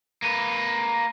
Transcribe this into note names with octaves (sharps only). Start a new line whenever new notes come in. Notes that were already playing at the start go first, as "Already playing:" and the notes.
A#3 B4